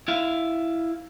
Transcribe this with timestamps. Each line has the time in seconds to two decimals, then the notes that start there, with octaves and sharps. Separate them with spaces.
0.08 E4 F5